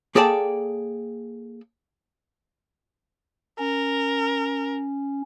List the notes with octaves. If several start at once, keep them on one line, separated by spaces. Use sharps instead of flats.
A#3 G#4 A4 D5 G5 A5
C#4 A#4